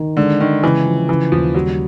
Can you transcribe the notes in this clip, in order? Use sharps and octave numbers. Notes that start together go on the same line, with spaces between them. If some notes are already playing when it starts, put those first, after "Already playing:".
Already playing: D#3
D3 G#3
D#3 G#3
C#3 E3
F3
C#3 E3
D#2 F3
F#3 G3